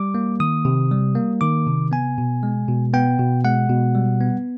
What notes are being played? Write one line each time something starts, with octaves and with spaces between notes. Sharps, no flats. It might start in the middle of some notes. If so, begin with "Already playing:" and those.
Already playing: G3 D6
A#3
D#3 D#6
C3
G3
A#3
D#3 D6
C3
B3 G#5
B2
G#3
B2
B3 G5
B2
G#3 F#5
B2
G3
B3